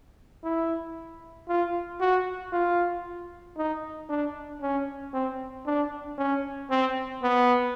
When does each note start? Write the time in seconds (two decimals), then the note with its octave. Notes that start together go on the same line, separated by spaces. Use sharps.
0.44 E4
1.49 F4
2.01 F#4
2.53 F4
3.58 D#4
4.09 D4
4.62 C#4
5.14 C4
5.66 D4
6.18 C#4
6.70 C4
7.23 B3